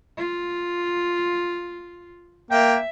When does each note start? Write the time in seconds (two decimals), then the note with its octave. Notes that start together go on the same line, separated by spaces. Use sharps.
0.17 F4
2.51 A#3 E5 G5